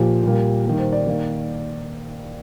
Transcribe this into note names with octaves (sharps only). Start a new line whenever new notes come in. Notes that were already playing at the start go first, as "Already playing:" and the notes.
Already playing: A#2 F3 G4
A#2 G3 A#3
D#3 G3 A#3 A#4
C5
D5
D#3 A#3